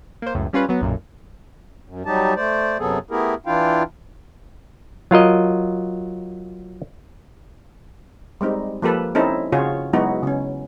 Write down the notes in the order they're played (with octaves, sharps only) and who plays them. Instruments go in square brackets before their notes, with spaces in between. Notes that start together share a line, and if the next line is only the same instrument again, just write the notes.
[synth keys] A#3 C5
C#2 F#2 A2
G3 C#4 F4 B4
F#3 B3
B1 F#2 A#2
[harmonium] F#2
F#3 G3 D#4 G4 A5
A3 C5 D5
F#2 C3 F#3 B3 G#4 A4
A3 B3 E4 G4 G#4 A#4
E3 D4 E4 F4 F5 G5
[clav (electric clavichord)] F#3 F4 A#4 D#5
[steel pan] G3 G#3 C4 D#4
F3 A#3 G4 A4 B4
C4 C#4 D#4 E4 A4
C#3 F4 F#4 G#4 C#5
F#3 G#3 B3 D#4 E4 F#4
C#3 C#4